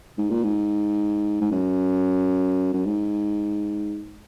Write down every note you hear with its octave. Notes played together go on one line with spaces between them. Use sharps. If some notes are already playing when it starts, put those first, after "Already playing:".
G#2
A#2
G#2
G#2
F#2
F#2
G#2